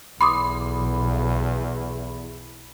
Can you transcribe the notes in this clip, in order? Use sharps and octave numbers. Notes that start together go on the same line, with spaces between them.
B1 E2 B5 C6 D6 D#6